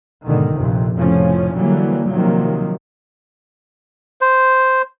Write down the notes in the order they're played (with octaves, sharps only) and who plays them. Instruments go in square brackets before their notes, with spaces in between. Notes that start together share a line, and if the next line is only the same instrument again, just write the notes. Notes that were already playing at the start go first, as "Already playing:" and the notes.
[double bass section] G#2 B2 D3 D#3
A#1 F2 C3
F1 A2 C#3 F3 C#4
D3 E3 F#3 G3 A#3
C3 D#3 F3 F#3 A#3
[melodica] C5